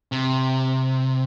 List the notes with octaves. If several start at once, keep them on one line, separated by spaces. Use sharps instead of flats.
C3